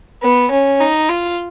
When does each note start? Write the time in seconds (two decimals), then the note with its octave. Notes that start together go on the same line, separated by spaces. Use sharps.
0.22 B3
0.51 C#4
0.80 D#4
1.09 F4